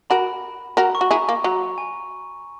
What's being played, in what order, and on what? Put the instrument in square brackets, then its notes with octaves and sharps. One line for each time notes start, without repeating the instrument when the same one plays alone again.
[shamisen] F#4 A#4 [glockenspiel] B5
[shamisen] F#4 A#4 [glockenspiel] A#5
[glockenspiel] C#6
[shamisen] F#4
[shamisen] E4 G#4 [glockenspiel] A#5
[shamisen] A#3
[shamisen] F#3 [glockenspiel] A#5
[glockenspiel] G#5